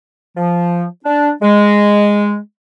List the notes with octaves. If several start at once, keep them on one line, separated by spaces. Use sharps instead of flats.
F3
D4
G#3